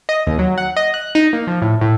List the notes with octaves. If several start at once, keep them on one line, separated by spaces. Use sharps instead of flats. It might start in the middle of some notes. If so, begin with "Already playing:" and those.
D#5
D#2
F#3
F#5
D#5
F#6
D#4
A#3
F3
A2
A2